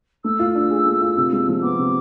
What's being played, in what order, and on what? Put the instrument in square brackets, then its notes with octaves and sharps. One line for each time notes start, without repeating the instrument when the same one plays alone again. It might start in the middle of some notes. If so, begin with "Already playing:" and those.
[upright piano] A3 [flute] E6
[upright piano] F4
D4
G#4
A3
F4
C3
G#3
F3
[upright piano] B3 [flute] D6
[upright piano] C3